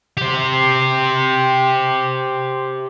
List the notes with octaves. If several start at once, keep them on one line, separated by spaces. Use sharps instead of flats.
G4 C5